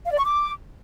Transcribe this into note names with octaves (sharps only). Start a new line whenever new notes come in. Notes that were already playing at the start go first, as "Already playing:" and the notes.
F5
D5
C#6
D6